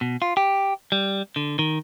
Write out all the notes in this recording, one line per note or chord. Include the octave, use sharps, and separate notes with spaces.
B2
F4
G4
G3
D3
D#3